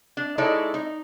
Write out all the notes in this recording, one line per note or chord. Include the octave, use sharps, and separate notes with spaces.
D4
G#3 D#4 E4 A4 C#5 D5
D#4